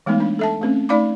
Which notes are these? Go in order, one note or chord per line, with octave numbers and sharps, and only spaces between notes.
E3 G#3 A3 B3 D#4
D4
A4 E5 A5
A3 C4 C#4
A3 D#4 D5 F5 B5 D6